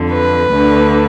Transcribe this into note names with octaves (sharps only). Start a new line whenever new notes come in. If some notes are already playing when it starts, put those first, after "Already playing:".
Already playing: F2 D3
B4
D2 D3